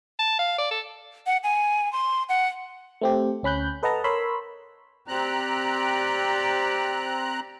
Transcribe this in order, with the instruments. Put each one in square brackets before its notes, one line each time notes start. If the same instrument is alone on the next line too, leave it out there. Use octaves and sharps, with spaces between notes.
[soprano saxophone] A5
F5
D5
A4
[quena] F#5
G#5
C6
F#5
[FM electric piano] A3 C4 G4
D2 C#4 B5 F#6 G6
A4 B4 D#5 F#5 A5 A#5
A#4 C#5 B5 C6 E6
[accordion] C4 A#5 F#6 [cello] G4 D5